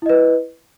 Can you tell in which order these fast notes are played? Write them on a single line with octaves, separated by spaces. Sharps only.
E4 D#5 B4